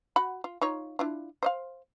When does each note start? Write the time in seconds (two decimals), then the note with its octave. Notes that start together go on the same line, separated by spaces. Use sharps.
0.16 F#4 F#5 B5
0.44 F4
0.61 D#4 F4 C#5
0.99 D4 E4 F4
1.43 C5 D#5 F5